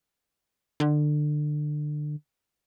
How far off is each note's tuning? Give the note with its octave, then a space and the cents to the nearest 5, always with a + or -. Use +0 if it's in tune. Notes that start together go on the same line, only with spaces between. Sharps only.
D3 +25